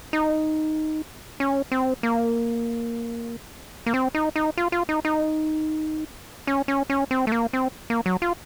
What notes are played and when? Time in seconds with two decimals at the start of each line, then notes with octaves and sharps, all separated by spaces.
0.13 D#4
1.40 C#4
1.72 C4
2.03 A#3
3.86 A#3
3.94 C4
4.15 D#4
4.36 D#4
4.57 F4
4.72 F4
4.89 D#4
5.05 D#4
6.47 C#4
6.68 C#4
6.90 C#4
7.11 C4
7.27 A3
7.32 A#3
7.53 C4
7.90 A#3
8.06 F#3
8.22 F4